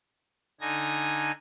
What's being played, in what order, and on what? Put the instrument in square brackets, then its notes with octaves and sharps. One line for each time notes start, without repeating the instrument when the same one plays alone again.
[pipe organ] D3 D#4 G#5 A#6